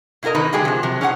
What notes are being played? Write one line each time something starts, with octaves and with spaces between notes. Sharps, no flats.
B2 E4 F4 A#4 D#5
C3 D#3 D#4 B4
D3 F#3 G#3 G4 G#4
C3 F3
C3 F#3
C#4 G#4 D#5 F#5